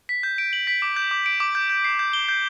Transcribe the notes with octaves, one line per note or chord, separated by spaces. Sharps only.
B6
G6
D7
F#7
B6
D6
G6
D6
D7
D6
G6
G6
C7
G6
G7
G6